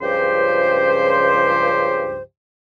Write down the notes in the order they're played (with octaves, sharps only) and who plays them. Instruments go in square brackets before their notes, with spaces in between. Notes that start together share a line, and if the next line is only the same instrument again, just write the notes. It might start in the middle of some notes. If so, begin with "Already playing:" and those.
[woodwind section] C#2 G2 C#3 F3 G4 C5